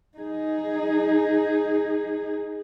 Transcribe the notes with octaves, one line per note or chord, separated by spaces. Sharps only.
D#4 G#4